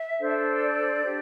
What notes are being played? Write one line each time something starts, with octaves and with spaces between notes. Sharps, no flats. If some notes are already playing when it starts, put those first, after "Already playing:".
Already playing: E5
D4 A4 C5
D5
D4 G4 C5